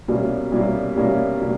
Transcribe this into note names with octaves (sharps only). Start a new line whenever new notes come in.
C2 B2 G3 A#3 C#4
C2 B2 G3 A#3 C#4
C2 B2 G3 A#3 C#4
B2 G3